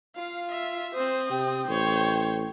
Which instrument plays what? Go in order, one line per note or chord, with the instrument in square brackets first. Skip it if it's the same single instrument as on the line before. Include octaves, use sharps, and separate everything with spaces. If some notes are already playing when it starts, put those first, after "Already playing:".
[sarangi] F4 [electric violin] F5
[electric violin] E5
[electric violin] C4 D#6 [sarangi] C5
[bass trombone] C3 [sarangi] G5
[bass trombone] A1 [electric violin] C5 C#5